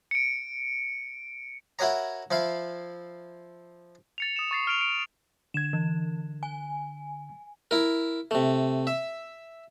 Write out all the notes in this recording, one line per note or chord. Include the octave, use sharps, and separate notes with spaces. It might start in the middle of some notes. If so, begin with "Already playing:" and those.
C#7 D7
E4 F#4 A#4 C#5 A#5
F3 E4 F5
A6 C#7 F7
D#6 E7
C#6 A6 C7
F6 D7 F7
D7
D3 G#6 E7
E3
G#5
E4 A#4
C3 A3
E5